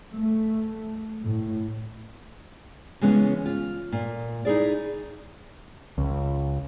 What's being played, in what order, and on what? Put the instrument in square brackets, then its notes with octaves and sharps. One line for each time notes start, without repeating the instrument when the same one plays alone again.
[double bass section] A3
A2
[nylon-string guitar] C#3 E3 G#3 B3 C#4
F4
A#2
D#4 E4 G#4 D5
[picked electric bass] C#2